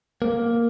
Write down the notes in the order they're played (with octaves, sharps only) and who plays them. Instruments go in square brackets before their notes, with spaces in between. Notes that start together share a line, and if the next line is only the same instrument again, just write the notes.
[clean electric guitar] A#3